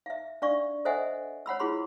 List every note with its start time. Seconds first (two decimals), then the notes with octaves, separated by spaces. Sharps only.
0.06 E5 F5
0.42 D4 D5 F5 C#6
0.85 A4 C5 D#5 E5 F#5 G#5
1.46 C#5 F#5 B5 E6
1.60 E4 F4 G#4 B5 C6